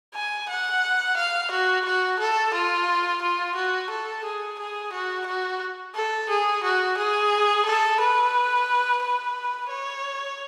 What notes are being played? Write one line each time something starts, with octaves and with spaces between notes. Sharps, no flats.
G#5
F#5
F5
F#4
F#4
A4
F4
F4
F#4
A4
G#4
G#4
F#4
F#4
A4
G#4
F#4
G#4
A4
B4
B4
C#5